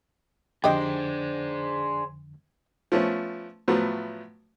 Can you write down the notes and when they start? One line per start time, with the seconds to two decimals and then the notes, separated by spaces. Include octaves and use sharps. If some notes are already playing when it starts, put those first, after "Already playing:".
0.64 F2 D3 D4 G4 G#4 C5 D#5 G5
2.92 F3 A3 B3 C#4
3.68 A2 F3 F#3 A3 B3